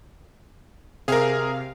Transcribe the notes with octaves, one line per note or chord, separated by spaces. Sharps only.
C3 G#4 A#4 F5